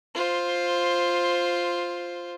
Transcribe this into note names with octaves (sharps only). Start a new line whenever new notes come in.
F4 C5